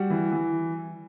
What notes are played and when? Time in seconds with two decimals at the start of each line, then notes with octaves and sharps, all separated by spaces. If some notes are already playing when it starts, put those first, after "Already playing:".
Already playing: G3 F#4 F#5
0.10 E3
0.32 E3